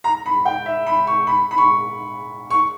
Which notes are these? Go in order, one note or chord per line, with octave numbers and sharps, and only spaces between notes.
A#5
B5
G5
E5
B5
C#6
B5
B5
C#6
C#6